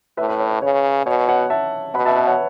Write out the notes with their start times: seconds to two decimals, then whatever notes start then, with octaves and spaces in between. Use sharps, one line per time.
0.17 A2 B4 E5
0.29 B4
0.40 C#5
0.50 C#5
0.62 C#3 C#5
1.06 B2 C#5
1.28 C#5 F#5
1.50 E5 A5
1.94 B2 F#5 B5
2.05 E5 A5
2.16 B4 E5
2.27 C#5 F#5